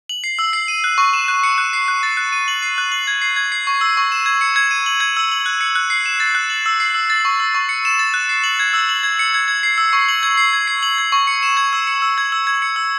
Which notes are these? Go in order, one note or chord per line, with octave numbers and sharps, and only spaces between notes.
F#7
C7
E6
C7
D#7
F#6
C#6
E7
F#6
C#7
F#6
C7
F#6
A6
F#6
D#7
F#7
C7
F#6
F#7
G#6
C7
G#6
C7
C#6
E6
C#6
E7
G#6
C#7
G#6
D#7
F#7
G#6
E6
F#7
F#6
C#7
F#6
C7
E7
A6
F#6
F#7
E6
C7
E6
A6
C#6
E6
C#6
C#7
E7
A6
F#6
C7
F#7
G#6
E6
F#7
G#6
C#7
G#6
G#6
C7
E6
C#6
F#7
G#6
C7
G#6
C7
F#7
G#6
C#6
C#7
E7
G#6
E6
C#7
E6
G#6
E6
G#6
C#7
E6